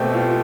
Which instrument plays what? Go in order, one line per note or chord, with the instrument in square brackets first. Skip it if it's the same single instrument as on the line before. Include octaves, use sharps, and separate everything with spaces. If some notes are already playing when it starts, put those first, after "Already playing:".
Already playing: [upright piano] B2 A3 C4 G4
F4